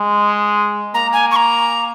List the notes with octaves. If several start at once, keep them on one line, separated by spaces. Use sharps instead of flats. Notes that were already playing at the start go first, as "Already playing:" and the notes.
Already playing: G#3
A#3 A#5
G#5
C#6
A#5